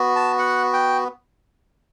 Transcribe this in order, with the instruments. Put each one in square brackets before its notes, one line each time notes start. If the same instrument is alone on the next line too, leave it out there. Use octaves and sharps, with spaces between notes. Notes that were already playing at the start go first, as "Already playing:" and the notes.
Already playing: [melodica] B3 F#4
A5
F#5
G5